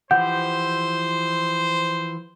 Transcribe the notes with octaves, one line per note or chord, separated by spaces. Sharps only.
E3 F3 G4 C5 F#5 G6